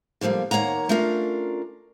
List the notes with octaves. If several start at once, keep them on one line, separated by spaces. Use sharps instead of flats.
D3 F3 G3 G#3 A#3
D#2 A#3 C#5 F#5 A#5
A3 C#4 D4 F4 A#4